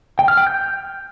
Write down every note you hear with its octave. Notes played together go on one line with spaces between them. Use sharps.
G5
F6
G5
G6